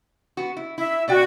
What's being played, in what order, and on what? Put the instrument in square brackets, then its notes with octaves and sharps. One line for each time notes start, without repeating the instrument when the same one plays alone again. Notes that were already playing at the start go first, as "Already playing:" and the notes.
[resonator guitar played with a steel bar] B3 F#4
E4
[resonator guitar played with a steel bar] E4 [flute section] E5
[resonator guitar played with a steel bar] B2 D5 G5 [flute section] F#4